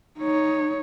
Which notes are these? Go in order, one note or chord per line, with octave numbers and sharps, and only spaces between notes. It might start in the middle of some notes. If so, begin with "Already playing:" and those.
D#4 C#5